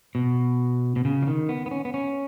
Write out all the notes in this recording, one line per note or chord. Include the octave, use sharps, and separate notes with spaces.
B2
B2
C#3
F3
D#3
B3
B3
C#4
B3
C#4